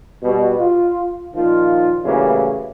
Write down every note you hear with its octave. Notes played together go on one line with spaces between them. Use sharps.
B2 G3
F4
A#2 D#3 F3 F4
A2 C#3 E3 F#3 G3 A#3